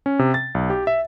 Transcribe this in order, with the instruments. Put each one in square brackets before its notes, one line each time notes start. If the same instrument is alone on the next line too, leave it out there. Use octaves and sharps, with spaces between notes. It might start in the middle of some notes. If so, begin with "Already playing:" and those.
[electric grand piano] C#4
C3
A6
B1
G4
E5